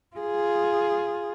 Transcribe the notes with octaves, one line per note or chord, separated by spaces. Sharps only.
F4 G#4